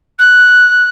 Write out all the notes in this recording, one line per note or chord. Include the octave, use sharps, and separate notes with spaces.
F#6